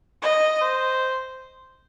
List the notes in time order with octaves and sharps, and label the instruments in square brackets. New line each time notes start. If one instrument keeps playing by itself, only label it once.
[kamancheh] D#5
[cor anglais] C5